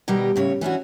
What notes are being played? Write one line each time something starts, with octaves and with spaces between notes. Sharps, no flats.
B2 D#3 G3 G4 A#4 B4
A2 C#3 C#5
E3 C#4 D4 F#4